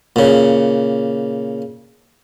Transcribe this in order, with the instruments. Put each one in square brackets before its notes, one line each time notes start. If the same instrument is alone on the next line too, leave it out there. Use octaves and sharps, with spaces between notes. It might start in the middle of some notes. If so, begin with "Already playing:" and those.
[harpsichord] A#2 C#3